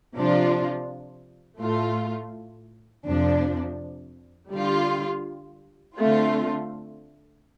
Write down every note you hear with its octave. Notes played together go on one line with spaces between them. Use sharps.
C3 F3 D4 F4
A2 A3 F4
F2 C3 F3 D4
D3 G3 F4
D3 A3 C4 F4